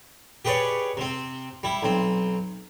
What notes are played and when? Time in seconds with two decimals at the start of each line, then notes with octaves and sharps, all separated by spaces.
0.45 G4 G#4 B4 C#5 D5
0.97 C3 C4
1.63 G3 E4
1.83 B1 C4